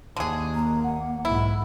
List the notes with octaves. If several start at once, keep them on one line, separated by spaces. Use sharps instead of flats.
D#2 D3 G#4
A#3 A#5
F#5
B1 G#2 E4